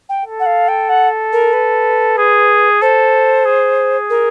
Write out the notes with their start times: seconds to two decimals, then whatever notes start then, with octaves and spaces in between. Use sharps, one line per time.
0.09 G5
0.25 A4
0.40 F#5
0.46 F5
0.68 G5
0.89 F#5
1.33 A#4
1.53 B4
2.18 G#4
2.82 A4 C5
3.45 G#4
4.10 A#4